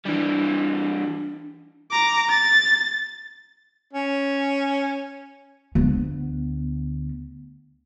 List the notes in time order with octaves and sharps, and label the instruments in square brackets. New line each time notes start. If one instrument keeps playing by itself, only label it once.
[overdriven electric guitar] E3 G3 [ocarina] D4
[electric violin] A#5 D6
A6
[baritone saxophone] C#4
[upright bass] D2 B3